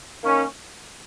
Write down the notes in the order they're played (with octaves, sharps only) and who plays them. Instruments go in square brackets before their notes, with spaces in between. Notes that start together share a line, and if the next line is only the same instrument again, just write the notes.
[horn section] D#3 A#3 C#4